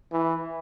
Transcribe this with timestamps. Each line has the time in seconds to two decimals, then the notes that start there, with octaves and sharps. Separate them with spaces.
0.12 E3